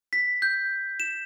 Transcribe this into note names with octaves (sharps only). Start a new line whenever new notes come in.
B6
G6
E7